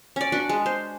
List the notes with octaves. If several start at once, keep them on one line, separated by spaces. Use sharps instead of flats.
C#4 D5
D4 F#4 B4
G#3
C5